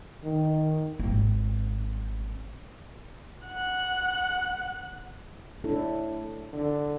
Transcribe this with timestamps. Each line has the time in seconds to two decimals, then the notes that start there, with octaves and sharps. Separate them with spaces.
0.24 D#3
0.99 G#1 C4
3.47 F#5 F#6
5.64 A2 D4 E4 A4
6.53 D3